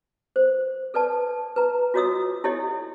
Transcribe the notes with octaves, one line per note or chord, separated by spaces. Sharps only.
C5
A4 B4 D5 A5
B4 A#5
F4 F#4 C#5 D#5 D#6 E6
E4 G4 A4 C#5 D#5